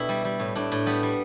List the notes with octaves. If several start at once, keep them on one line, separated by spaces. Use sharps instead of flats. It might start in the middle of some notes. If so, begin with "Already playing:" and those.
Already playing: B2 D4 E4 G4 A4
G3
G3
A2
A2 D4
A2
G3 B3
G3